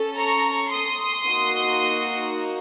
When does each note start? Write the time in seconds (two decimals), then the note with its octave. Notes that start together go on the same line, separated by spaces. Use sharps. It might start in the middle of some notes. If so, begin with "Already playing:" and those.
Already playing: C#4 A4
0.17 A#5 C#6
0.71 C6 D#6
1.27 A#3 D#4 F#4